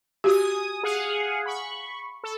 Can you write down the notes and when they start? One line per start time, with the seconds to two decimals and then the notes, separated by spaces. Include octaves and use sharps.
0.24 F#4 G4 G#5 D#6
0.83 G#4 F5 F#5
1.46 B5 C#6
2.24 A4